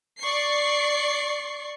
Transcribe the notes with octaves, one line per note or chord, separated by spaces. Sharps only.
D5 C#6 C7